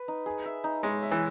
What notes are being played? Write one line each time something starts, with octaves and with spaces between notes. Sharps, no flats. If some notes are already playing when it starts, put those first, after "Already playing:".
Already playing: B4
D#4
G#4
E5
D#4
G#3 C#5
E5
E3